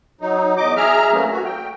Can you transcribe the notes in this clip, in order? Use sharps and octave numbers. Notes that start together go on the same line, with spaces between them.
F#3 D#4
E2 D#5 D6
G#4 E5 A#5 F6
E3 F#3 A3 A#3 C#4
F#4
G5